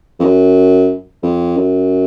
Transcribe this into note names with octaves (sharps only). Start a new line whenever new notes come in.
F2
F#2
F2
F#2